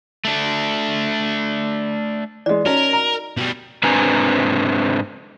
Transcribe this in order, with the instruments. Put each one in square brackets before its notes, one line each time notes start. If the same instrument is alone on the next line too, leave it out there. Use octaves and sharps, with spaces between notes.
[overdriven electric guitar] A3 D4
[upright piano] E3 G#3 [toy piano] D5 D#5
[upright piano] C#4 [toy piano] D#4 F#4 [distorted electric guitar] A#4
[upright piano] A#5
[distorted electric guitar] B2 G3
[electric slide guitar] G#2 C4 D4 B4 G#5 A#5